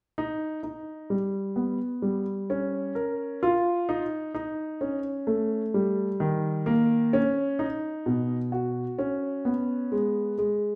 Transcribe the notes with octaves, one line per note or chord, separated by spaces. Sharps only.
D#4
D#4
G3
B3
G3
C#4
A#4
F4
D#4
D#4
C#4
A3
G3
D#3
A#3
C#4
D#4
B2
F#4
C#4
B3
G#3
G#3